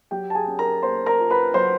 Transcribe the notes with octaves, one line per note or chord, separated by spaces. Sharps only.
F#3 G4 G5
A5
G#4 G#5
C#4
A#4 A#5
A#3 C5 C6
A#4 A#5
F4
B4 B5
F#3 C5 C6